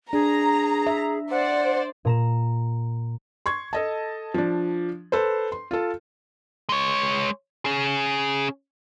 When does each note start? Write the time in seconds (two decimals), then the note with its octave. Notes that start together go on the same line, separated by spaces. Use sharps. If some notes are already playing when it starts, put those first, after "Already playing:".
0.13 D4 G#4 A#5
0.87 E5
1.31 C5 D5 F#5
2.05 A#2 A#5 E7
3.46 C6 C#6 G#6
3.73 A4 D#5 A5
4.34 F3 D4
5.12 A4 B4 C5
5.52 C6
5.71 F4 A4
6.69 G#3 C#5
7.65 C#4 G#4